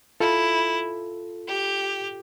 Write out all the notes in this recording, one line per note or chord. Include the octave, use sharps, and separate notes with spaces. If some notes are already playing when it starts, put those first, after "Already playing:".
E4 F4 A4
G4